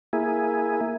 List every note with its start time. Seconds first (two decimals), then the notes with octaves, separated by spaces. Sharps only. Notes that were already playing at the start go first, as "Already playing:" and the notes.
0.13 A#3 E4 G#4